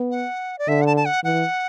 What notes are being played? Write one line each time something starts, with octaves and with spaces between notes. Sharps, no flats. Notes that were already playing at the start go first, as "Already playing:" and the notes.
Already playing: B3
F#5
D5
D3 E5
F#5
A5
A5
F#5
E3 F#5